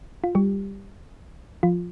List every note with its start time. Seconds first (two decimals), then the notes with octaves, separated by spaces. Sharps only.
0.24 F4
0.35 G3 G4
1.63 F3 F4